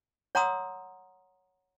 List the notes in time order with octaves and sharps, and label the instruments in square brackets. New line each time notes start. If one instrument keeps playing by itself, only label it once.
[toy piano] C#5 F#5 A#5 C6 D#6 E6